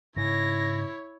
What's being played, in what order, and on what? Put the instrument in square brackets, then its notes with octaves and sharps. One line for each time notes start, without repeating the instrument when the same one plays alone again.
[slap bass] G#2 C#3 [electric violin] E4 C#5 [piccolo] A#6